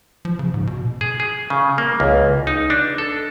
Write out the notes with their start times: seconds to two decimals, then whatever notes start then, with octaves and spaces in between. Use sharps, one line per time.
0.25 F3
0.39 C#3
0.54 G#2
0.67 B2
1.01 G#4
1.20 G#4
1.50 C#3
1.78 A#3
2.00 C#2
2.47 D#4
2.70 D4
2.98 A4